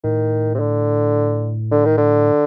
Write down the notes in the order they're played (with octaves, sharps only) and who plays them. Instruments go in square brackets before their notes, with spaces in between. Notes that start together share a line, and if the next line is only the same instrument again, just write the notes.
[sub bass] A2 [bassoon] D#3
[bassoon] C3
D3
D3
D#3
D3